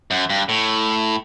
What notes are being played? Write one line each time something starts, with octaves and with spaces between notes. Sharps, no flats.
F#2
G2
A2